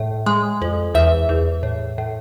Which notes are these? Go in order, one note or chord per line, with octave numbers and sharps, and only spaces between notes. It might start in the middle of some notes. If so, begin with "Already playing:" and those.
Already playing: A2
G#3
F2
E2 E5
E2
A2
A2